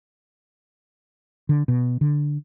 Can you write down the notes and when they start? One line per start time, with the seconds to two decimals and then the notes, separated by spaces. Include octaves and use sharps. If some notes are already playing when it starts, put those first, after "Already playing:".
1.49 D3
1.68 B2
2.01 D3